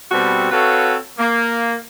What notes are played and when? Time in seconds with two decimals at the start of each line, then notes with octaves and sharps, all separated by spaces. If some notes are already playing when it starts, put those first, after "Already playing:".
0.12 B2 G3 C4 F#4 A4
0.52 C4 F#4 A4 B4 C#5 F5
1.19 A#3